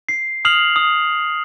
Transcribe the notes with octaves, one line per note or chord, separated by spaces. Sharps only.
C7
D#6 F6 C7 F7 F#7
D#6